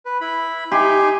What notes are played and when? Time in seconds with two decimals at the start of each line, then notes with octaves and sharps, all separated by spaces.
0.06 B4
0.21 E4 B5
0.72 D#4 G4 G#5 C6